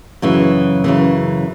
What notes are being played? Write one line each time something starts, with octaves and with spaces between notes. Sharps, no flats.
F#2 C#3 E3
F#2 C#3 E3